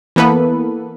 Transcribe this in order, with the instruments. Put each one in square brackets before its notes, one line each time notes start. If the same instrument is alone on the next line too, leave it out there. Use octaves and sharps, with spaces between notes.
[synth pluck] E3 A#3 B3 A4 B4